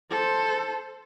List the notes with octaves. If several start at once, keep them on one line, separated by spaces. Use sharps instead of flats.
A4 C5